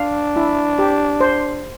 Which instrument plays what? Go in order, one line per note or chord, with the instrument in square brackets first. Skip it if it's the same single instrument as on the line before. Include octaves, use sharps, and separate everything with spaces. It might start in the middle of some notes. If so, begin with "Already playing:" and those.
Already playing: [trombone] D4 [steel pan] F5
[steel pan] E4
G4
C5